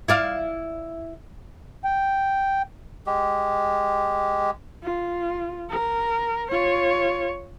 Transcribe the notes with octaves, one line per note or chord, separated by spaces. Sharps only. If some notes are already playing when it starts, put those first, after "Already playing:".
E4 D5 F5
G5
G#3 G4
F4
A#4
F4 C#5